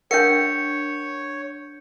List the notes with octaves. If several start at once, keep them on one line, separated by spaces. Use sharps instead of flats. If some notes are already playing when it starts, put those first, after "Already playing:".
D4 A#4 C#5 E5 F#5 G5 G6 C#7